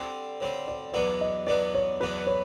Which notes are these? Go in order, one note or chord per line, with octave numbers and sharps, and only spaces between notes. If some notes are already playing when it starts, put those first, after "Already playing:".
Already playing: D3 G3 C4
D3 G3 C4 C#5
D5
E2 B2 F#3 B3 D4 D5
D#5
E2 B2 F#3 B3 D4 D5
C#5
E2 B2 F#3 B3 D4 B4
C#5